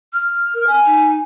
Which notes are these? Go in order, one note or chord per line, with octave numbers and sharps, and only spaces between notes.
F6
A#4
G#5
D#4